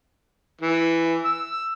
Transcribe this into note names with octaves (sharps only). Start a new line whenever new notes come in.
E3
E6